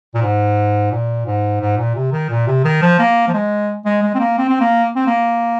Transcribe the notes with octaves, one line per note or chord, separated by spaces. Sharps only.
A#2
G#2
A#2
G#2
G#2
A#2
C3
D#3
A#2
C3
D#3
F3
A#3
F3
G#3
G#3
G#3
C4
A#3
C4
C4
A#3
C4
A#3